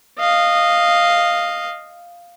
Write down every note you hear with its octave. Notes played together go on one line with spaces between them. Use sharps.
D#5 F5